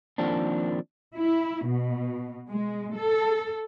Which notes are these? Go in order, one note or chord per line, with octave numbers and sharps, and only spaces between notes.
D#3 F3 A#3 C4 D4
E4
B2
G#3
A4